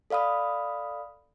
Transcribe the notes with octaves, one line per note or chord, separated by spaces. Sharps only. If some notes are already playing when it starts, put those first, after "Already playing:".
A4 D5 F5 B5 D#6